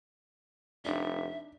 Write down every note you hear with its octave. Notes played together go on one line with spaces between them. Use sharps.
F1 D4 D#4 E5